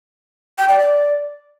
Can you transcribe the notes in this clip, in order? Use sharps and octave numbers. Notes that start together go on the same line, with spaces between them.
G5
D5
D5